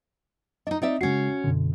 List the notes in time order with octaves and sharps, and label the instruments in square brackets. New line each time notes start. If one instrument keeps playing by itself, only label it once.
[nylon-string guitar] D4 D#4 [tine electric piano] D#5
[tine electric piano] C4 [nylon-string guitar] D#4 D5 E5
[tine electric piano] C#3 G#3 C7 [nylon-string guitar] C#4 F#4
[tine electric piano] F#2 B2 D3